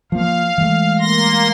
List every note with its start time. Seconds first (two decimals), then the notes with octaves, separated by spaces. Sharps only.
0.12 F3 A#3 F5
0.58 E3 G#3 A3
0.99 A#3 C6 A#6